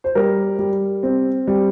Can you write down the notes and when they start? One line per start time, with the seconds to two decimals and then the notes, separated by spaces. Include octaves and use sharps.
0.04 C5
0.15 G3 A#4
0.59 G3
1.03 C4
1.47 G3